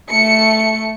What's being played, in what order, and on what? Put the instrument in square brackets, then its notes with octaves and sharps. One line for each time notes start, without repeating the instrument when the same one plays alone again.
[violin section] A3 C#7